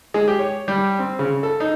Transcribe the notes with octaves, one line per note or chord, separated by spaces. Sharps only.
G#3
G4
C#5
G3
C4
C#3
A4
D#4